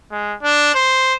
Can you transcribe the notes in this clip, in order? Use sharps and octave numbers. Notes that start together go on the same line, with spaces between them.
G#3
D4
C5